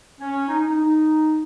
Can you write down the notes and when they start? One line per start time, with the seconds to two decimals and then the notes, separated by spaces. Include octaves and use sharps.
0.20 C#4
0.48 D#4
0.62 D#4
0.76 D#4